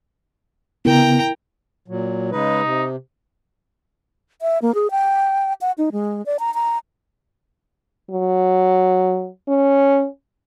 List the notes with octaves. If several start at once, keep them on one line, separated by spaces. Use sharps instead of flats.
C#3 B3 E4 A#4 G5 A#5
A#2 F#3
C#3 G#3 D#4 B4
C3
E5
A#3
G#4
G5
F#5
D#4
G#3
D5
A#5
A#5
F#3
C#4